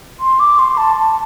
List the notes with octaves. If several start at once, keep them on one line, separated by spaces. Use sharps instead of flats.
C6
D6
C6
A5
A5